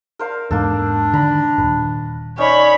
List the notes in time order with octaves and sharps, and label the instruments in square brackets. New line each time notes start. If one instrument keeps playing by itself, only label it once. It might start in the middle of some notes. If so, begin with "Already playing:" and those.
[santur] A#4 C5 F5
[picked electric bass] E2 G#2 [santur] A#3 A4 [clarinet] D4
[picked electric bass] D3 D#3 [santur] A#5 B5
[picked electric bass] D#1 G#1 [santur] B4
[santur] C#4 D#4 D5 [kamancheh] C#5 B5